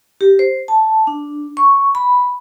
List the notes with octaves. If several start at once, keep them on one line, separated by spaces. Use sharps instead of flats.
G4
C5
A5
D4
C#6
B5